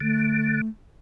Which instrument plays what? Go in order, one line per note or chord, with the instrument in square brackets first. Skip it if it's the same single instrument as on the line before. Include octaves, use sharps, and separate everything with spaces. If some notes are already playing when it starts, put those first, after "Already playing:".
[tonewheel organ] D3 [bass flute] A3